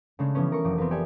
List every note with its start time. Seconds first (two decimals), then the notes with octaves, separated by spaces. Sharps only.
0.19 C#3 G#3 A3 D4
0.35 E3 F3 G3 B3 C#4
0.52 A#4 C#6
0.64 F1 F3 F#3 D6
0.78 B3 C4 F4 A#4 B4
0.91 G4 A4 D5 E5 G#5